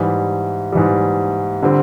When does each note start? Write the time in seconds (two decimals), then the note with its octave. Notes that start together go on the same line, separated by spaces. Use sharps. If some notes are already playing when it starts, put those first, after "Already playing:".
Already playing: G#2 E3 G3
0.72 G#2 E3 G3
1.62 D3 G3 C4